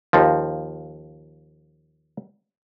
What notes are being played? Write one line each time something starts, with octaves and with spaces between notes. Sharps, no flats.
D#2 F3